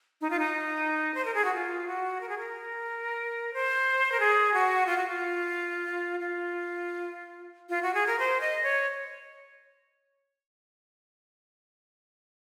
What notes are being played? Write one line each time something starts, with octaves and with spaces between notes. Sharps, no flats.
D#4
F4
D#4
C5
A#4
G#4
F#4
F4
F#4
A#4
G#4
A#4
C5
A#4
G#4
F#4
F4
F#4
F4
F4
F4
F#4
G#4
A#4
C5
D#5
C#5